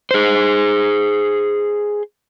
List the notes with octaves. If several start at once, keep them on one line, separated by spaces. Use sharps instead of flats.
G#4 C5